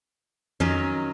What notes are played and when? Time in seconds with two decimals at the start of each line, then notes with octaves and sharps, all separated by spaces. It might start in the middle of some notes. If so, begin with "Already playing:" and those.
0.60 F2 D#3 F#3 C#4